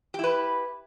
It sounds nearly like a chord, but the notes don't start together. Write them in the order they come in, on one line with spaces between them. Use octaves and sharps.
G4 E4 B4